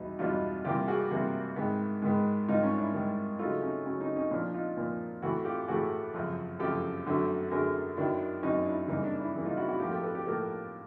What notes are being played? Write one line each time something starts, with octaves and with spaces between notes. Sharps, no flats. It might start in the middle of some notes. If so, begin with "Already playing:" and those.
Already playing: E2 B2 G3 B3 D#4
E2 B2 G3 B3 D#4 F4
C3 E3 G3 A#3 F4 G4
F#4 G#4
C3 E3 G3 A#3
G#2 D#3 G#3 B3
G#2 D#3 G#3 B3
G#2 D#3 G3 D#4 F4
C#4 D#4
D4 E4
G#2 D#3 G3
C#3 F#3 A3 D#4 F4
C#4 D#4
C#3 F#3 A3 C#4
C#4 D#4
C#4 D#4
A#2 F3 A#3 D4
D4
D#4 F4
A#2 F3 A#3
A2 E3 A3 E4 F#4
F4 G4
A2 E3 A3 F#4 G#4
F#2 C#3 F3
F#2 C#3 F3 G4 A4
F#2 D3 F#3 A3
F#2 D3 F#3 A3 G#4 A#4
F#2 D#3 F#3 D4 E4
F#2 D#3 F#3 C#4 D#4
D4 E4
C#3 E3 G3 A#3 C#4 D#4
D4
D4 E4
C#3 E3 G3 A#3
D#4 F4
E4 F#4
E4 F#4
A2 F3 A#3 F4 G4
G4 A4
A4 B4
G4 A4
A2 F3 A#3 G4 A4